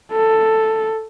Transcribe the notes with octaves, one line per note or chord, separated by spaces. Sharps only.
A4